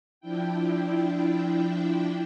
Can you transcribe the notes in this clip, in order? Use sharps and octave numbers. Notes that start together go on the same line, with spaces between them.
F3 D4 E4 G5